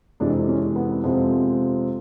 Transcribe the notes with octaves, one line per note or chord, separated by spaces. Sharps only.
F2 C3 E3 G#3 D4
C#4
B3
F2 C3 F3 G#3